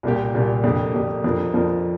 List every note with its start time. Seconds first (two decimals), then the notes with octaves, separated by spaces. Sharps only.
0.03 C2 A#2 A#3 G4
0.34 C2 A#2 A#3 G4
0.64 F2 D3 A#3 D4 G4
0.94 F2 D3 A#3 D4 G4
1.24 F2 F3 D4 A#4
1.54 F2 F3 D4 A#4